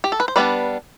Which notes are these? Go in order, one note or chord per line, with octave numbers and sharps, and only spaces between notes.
G4
A4
B4
C5
G3 B3 D4 B4 D5